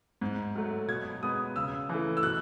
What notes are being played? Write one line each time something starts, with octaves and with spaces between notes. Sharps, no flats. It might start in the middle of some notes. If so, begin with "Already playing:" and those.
G#2
F#3 A3
B2 G#6
G#3 B3 D#6
C#3 E6
E3 A3
E6
B2 F#6